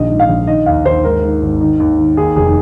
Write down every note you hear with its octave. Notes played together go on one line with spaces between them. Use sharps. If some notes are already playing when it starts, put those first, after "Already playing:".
Already playing: A#1 D#3 D#5
G#2
F5
A#1
D#3 D#5
D#2 F5
D#2 C5
G#2 A#4
G#2
G#1
D#3
D#2
D#3
D#2 G#4
F1 G#4